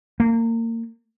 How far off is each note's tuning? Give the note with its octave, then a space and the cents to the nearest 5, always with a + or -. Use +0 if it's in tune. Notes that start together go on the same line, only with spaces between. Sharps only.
A#3 -30